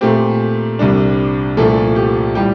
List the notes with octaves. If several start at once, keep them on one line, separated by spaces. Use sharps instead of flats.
A#2 A3 C4 G4
C2 C3 G3 D4
C2 A#2 F3 A3 A4
G4
A2 G3 G4